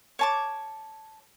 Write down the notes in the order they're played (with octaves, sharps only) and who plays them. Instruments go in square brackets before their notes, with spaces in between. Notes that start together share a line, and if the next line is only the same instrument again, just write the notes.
[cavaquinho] C#5 A5 D6